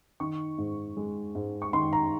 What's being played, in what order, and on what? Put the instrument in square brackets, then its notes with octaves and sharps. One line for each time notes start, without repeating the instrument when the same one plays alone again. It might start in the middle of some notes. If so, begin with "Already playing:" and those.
[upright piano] D#3 C#6
G#2
G#3
G#2
C#6
D#3 C6
A#5